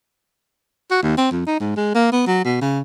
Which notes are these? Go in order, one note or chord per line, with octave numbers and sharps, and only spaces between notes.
F#4
D#2
C4
F2
D#4
G#2
G#3
A#3
B3
F#3
B2
C#3